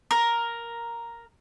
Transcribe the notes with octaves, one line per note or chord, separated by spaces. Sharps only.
A#4